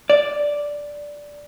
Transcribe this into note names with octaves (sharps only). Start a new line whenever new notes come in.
D5